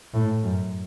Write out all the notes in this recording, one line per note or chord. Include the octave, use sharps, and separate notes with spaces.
A2
F#2